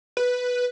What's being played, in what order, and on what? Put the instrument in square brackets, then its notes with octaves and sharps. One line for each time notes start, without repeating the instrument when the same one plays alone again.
[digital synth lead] B4